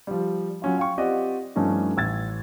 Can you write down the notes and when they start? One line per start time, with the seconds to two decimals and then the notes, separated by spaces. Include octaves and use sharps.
0.07 F3 G3
0.62 F#3 C#4 F4
0.78 F5 G5 C#6
0.97 C4 F4 G4 D5 D#5 F#5
1.56 G2 F3 A3 C#4 D#4
1.97 A1 E6 G#6 A6